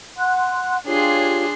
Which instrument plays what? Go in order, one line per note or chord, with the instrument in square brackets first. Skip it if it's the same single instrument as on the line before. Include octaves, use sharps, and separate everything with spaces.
[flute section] F#5 C6 F#6
[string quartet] D4 G#4 C6 [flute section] F4 G4 C#5